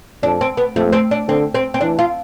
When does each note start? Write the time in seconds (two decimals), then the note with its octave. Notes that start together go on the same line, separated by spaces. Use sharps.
0.23 F2 D4
0.41 C4
0.57 B3
0.75 F2 A3
0.93 C4
1.11 D4
1.28 D3 C4
1.54 C4
1.74 C4
1.81 E3 D4
1.99 F4